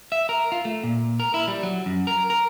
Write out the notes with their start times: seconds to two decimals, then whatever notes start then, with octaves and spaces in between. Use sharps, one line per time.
0.12 E5
0.29 A#4
0.52 F4
0.65 A3
0.84 A#2
1.20 A#4
1.34 E4
1.48 G3
1.63 F#3
1.86 F#2
2.07 A#4
2.30 A#4